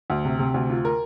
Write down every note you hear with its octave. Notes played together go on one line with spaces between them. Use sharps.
D2
C3
C3
D2
F4
A#4